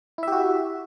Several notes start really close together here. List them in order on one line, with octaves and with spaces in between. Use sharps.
E4 E5 G4 F#4